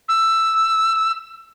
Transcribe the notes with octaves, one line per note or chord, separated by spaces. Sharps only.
E6